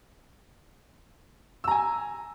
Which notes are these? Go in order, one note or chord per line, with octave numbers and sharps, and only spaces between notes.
G#5 A#5 E6